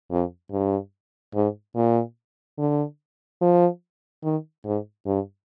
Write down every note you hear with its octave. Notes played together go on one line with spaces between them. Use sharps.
F2
G2
G#2
A#2
D3
F3
D#3
G#2
G2